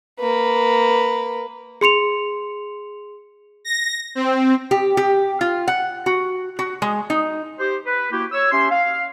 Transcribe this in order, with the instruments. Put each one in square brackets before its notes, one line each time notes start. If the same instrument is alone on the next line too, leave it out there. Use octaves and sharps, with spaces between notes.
[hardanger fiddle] A#3 B4
[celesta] G#4 C6 C#7 F7
[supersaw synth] A#6
C4
[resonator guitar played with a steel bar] G4
G4
F4
F#5
F#4
F#4
G#3
D#4
[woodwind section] G4 C5
B4
A#3 E4 F#4 G4
C#5 E6
C#4 G4 E5 C6
F5